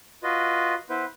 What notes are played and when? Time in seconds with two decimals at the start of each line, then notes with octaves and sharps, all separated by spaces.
0.23 F4 F#4 B4 D#5
0.90 B3 E4 B4 C5